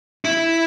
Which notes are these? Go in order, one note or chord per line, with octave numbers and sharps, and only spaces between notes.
E4